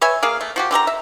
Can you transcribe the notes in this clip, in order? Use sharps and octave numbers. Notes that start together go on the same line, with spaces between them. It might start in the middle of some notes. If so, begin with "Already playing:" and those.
B4 C#5 E5 G#5
A#3 G#4 F5
A3
F3 F#4 G4
D3 G4 A#4 A#5
E5